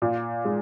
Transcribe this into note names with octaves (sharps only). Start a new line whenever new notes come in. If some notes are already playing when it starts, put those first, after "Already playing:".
A#2
G#3